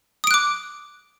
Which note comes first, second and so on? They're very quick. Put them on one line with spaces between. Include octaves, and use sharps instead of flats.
D#6 D7 F#6 D6